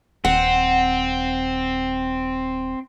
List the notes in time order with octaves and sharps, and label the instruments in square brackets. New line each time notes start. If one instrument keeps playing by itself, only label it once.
[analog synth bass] D#1 [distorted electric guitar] C4 [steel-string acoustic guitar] F#5